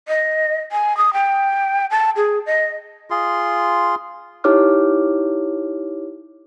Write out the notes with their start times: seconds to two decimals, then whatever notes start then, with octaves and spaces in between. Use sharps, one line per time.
0.08 D#5
0.72 G#5
0.97 D#6
1.13 G5
1.91 A5
2.16 G#4
2.46 D#5
3.10 F4 G#4 C6
4.44 D#4 E4 G4 C#5 D6 F6